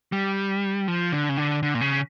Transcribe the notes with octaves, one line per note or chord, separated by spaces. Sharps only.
G3
F3
D3
C#3
D3
D3
A#2
C#3